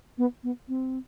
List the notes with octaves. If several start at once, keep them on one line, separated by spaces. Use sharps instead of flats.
B3
B3
C4